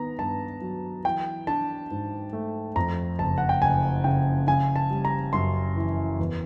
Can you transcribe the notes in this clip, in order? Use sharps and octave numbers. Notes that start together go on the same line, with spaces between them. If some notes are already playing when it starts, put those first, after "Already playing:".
Already playing: D#3 B3 A#5
G2 A5
F#3
E3 G5
D4 A5
G#2
A3
F2 A#5
F#1 A5
F#5
G5
F#1 G#5
C#3 G5
C#3 G#5
A5
G3
A#5
F#2 C6
E3
E2